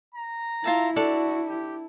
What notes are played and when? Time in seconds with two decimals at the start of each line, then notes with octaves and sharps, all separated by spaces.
0.15 A#5
0.64 E4 F4 E5 A5
0.96 D4 F#4 A4
1.48 G4